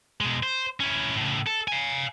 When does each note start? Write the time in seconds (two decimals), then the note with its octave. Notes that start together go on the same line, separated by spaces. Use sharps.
0.21 B2 G#3
0.43 C5
0.80 C#4 E4
1.16 A2 C#3
1.47 A4
1.68 F5 G#5